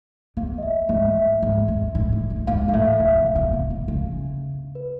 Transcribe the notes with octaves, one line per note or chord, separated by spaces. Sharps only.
E2 F5
D#5
E5
G#2 E5
E5
G#2
F2
A2
A2
G#2
G#2 F5
A#2 F5
A2 E5
B2 E5
C3
F5
B2
C3
B2
C#3
B4